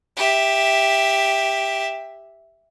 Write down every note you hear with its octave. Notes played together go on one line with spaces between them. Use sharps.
G4 E5